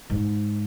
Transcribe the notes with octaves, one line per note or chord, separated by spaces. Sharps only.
G#2